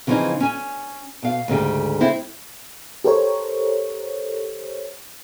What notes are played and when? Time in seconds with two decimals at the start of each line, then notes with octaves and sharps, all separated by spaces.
0.07 C#3 E3 F3 A#3 C4 D#4
0.40 C#4 G#5
1.23 B2 F5
1.48 D2 G#2 C#3 G4
2.00 G#3 C4 E4
3.04 G4 A4 A#4 C5 C#5